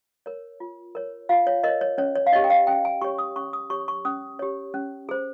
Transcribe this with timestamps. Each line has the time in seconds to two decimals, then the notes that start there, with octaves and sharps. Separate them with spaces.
0.26 A#4 C#5
0.60 F4
0.95 A#4 C#5
1.29 F4 F5
1.47 C#5
1.64 A#4 C#5 D#5
1.81 C#5
1.98 C#4 C#5
2.15 C#5
2.26 F5
2.33 G4 C#5 D#5
2.44 G5
2.50 F5
2.67 C#4 G5
2.85 G#5
3.01 G4 C#6
3.04 C#5
3.18 D#6
3.36 C#4 C#6
3.53 D#6
3.70 G4 C#5 C#6
3.88 C#6
4.05 C#4 D#6
4.39 G4 C#5
4.74 C#4
5.09 G#4 C5